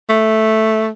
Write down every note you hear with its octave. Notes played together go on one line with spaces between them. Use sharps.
A3